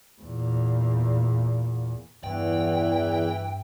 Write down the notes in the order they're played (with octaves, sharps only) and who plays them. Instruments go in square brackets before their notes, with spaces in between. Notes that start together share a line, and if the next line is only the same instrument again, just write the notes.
[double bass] E2 A#2
[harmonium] E2 [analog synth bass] G2 [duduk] E3 [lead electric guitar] G5